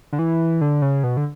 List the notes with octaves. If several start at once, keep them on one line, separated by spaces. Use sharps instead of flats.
D3
E3
D3
C#3
B2
D3